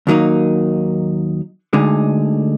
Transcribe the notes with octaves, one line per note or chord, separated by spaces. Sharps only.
D#2 D#3 F#3 A#3 D#4
D2 D3 G#3 D#4